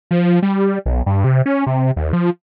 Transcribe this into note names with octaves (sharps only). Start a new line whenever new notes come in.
F3
G3
B1
G2
C3
C#4
C3
D#2
F3